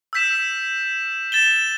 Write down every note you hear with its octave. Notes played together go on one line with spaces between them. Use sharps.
E6 G6 B6 E7
A6 E7 G7